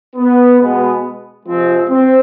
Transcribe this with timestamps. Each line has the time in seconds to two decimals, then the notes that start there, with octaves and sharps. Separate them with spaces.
0.16 B3
0.60 B2 G#3 B3
1.46 C3 F3 G#3 C4
1.89 C4